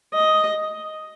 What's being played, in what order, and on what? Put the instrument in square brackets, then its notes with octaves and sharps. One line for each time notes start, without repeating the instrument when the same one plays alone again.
[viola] D#5